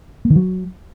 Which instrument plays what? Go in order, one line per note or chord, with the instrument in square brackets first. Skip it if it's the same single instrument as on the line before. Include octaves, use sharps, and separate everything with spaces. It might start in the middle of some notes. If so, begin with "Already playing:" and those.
[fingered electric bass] A#3
D#3
F#3